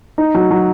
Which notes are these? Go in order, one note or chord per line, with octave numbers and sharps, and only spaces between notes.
D#4
F#3
F#3